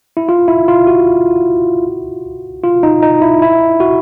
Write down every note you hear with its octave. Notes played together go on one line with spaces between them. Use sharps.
E4
F4
E4
F4
F#4
F4
D#4
D#4
E4
E4
F#4